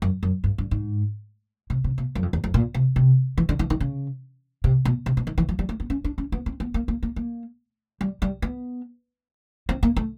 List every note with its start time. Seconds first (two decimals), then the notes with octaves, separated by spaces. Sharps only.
0.02 F#2
0.23 F#2
0.44 G2
0.58 G2
0.71 G#2
1.70 C3
1.84 C3
1.98 B2
2.15 F#2
2.22 F2
2.33 E2
2.44 F2
2.54 A#2
2.74 C3
2.96 C3
3.38 E3
3.49 D3
3.59 E3
3.70 D#3
3.80 C#3
4.64 C3
4.85 B2
5.06 C3
5.17 B2
5.27 D#3
5.38 E3
5.49 F3
5.59 G3
5.69 A3
5.80 B3
5.90 C#4
6.04 D4
6.18 C#4
6.32 B3
6.46 C4
6.60 B3
6.74 A#3
6.88 A#3
7.03 A#3
7.16 A#3
8.01 G3
8.22 G3
8.42 B3
9.69 C4
9.83 A#3
9.97 A3